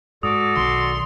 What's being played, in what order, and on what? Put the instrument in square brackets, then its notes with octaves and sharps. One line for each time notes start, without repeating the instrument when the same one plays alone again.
[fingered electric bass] G#2 [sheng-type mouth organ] F#4 A4 D5 [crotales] D#6
[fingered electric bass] B1 D#3 [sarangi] C6